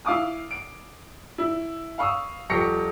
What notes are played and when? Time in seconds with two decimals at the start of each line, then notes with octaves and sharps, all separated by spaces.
0.05 E4 F5 D6 D#6
0.51 D7
1.38 E4
1.98 F5 B5 C#6 D#6 E6
2.49 D#1 F3 G4 C#6 A#6 C#7